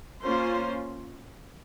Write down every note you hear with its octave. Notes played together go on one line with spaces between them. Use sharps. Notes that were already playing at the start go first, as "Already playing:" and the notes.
A#3 C#4 F4 C5